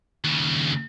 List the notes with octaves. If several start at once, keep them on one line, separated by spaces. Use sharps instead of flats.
D#2 C#3